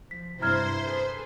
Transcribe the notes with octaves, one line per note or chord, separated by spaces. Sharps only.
F3 B6
G2 C3 E4 C5 A#5 F6 G#6
G#4 A4 B4